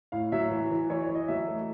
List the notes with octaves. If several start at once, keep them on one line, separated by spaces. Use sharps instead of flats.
A2 F5
F#3 E5
E3
E3
E3 C#5
C#5
E3
D#5
F#3 E5
A3